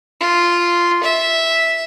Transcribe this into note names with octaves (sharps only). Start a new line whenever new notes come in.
F4
E5